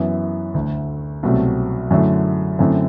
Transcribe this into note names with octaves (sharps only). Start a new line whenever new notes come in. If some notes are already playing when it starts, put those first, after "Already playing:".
Already playing: F#2 E3 B3 E4
D2 D3 A3
C2 B2 F#3 A3 C4
F#2 D3 F#3 A3 E4
F#2 D3 A3 C4 E4